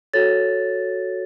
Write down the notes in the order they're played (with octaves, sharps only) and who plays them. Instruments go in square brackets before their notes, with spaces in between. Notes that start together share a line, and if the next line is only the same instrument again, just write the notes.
[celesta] F#4 A4 C#5 A6